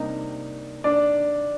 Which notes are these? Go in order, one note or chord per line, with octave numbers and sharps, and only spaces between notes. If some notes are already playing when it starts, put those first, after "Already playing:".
Already playing: C3 G3 A#3 D4 D#4
D4 D5